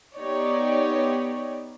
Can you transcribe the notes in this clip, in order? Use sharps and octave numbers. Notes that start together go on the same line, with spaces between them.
B3 D#4 G4 C#5 D5